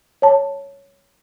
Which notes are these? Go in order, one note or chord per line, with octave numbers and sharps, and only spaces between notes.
C#5 A5